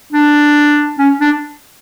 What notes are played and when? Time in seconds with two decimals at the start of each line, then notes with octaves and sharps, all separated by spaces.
0.12 D4
0.99 C#4
1.21 D4